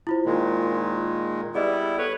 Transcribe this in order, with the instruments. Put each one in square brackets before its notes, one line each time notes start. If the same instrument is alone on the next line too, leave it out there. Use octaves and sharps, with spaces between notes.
[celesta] E4 F4 C5
[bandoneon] A#2 D#3 G#3
[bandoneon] G3 B3 E4 [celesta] G#4 D5 D#5
[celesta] A4 [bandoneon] B4 C#5